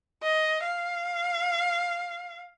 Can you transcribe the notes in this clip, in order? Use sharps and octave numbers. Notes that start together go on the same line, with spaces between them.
D#5
F5